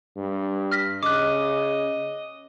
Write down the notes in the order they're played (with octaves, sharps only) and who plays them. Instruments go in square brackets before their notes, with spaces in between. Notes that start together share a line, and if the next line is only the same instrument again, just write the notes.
[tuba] G2
[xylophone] F6 A#6 B6
[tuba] C#3 [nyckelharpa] D#5 [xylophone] D6 F#6